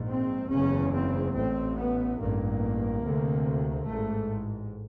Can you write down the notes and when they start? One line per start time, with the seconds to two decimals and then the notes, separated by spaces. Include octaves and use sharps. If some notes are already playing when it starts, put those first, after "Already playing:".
Already playing: A#1 G#2
0.08 C4
0.50 F#1 E2 C#3 C#4
0.92 C4
1.34 A1 A2 C4
1.76 B3
2.19 A1 G2 A#3
3.03 D2 C3
3.88 A1 G#2 A3